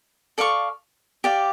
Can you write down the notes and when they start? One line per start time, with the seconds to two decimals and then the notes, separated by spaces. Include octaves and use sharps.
0.38 A4 D5 F5 C#6
1.24 G4 D5 F5